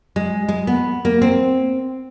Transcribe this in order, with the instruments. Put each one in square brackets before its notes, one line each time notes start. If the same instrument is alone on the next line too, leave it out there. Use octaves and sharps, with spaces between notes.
[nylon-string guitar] G#3
G#3
B3
A#3
C4